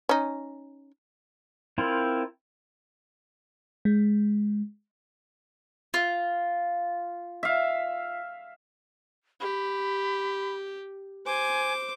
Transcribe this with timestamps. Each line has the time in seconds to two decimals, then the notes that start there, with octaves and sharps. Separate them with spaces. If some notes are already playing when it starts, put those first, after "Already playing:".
0.09 C#4 D#4
1.78 C4 E4 F4 A#4
3.85 G#3
5.94 F4
7.43 E5 F5
9.41 G4 B5
11.26 C5 G#5 D6